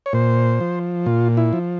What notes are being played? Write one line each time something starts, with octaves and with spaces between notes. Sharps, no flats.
C#5
A#2 C5
F3
A#2 F4
E4
F3